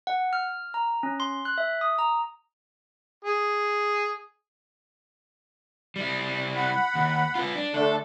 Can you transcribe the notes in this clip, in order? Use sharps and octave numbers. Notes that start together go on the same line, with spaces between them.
F#5
F6
A#5
C#4
C6
F#6
E5
D#6
A#5
G#4
G3 E4
F#5 B5
D#2
F4 B4
D4
D3 A3 D4 A4